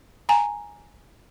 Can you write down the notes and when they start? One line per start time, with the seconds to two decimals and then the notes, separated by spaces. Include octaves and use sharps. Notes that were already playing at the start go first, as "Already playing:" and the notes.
0.29 G#5 A#5